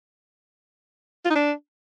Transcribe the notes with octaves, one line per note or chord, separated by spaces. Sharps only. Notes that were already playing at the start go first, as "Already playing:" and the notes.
F4
D#4
D4